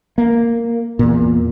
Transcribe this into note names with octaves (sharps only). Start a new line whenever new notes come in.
A#3
E2 A#2